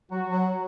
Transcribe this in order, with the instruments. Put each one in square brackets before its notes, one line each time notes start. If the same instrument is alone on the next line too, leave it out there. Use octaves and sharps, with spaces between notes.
[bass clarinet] F#3 [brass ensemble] F#4
[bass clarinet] F#3